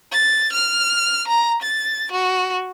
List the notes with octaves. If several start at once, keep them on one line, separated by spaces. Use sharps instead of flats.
A6
F6
A#5
A6
F#4